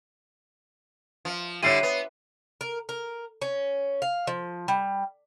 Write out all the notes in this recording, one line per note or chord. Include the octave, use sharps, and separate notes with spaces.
F3
D3 G3 E4 C#5 C7 D#7
B3
A#4
A#4
C#4
F5
F3
G3